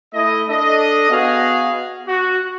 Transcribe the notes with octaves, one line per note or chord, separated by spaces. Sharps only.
A3 E4 D#5
D4 A4 D#5
B3 F#4 G#4 D#5 F5
F#4